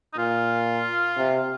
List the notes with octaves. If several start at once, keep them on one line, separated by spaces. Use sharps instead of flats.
D#4
A#2 F4
C3